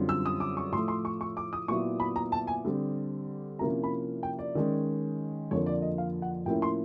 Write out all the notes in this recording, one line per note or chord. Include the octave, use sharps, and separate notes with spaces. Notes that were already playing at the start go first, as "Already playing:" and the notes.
Already playing: F#2 D3 G3 C4 F4
E6
D#6
D6
C#6
A2 F3 A3 C6
C6
C#6
C#6
D6
D#6
A#2 F#3 B3 E4 C#6
B5
A#5
A5
G#5
D3 G3 C4
C3 F3 A#3 C#4 E4 A#5
B5
G5
D5
D#3 G#3 C#4
F2 D3 F3 A#3 C#5
D5
D#5
F5
F#5
A2 F3 A#3 C#4 E4 G5
C6